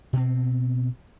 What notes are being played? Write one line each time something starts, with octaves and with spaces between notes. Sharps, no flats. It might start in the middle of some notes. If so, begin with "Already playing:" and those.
B2 C4